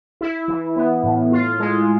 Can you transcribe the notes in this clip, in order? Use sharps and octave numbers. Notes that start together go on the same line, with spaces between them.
E4
E3
B3
A2
F4
G#3